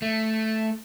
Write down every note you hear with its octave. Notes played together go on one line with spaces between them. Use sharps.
A3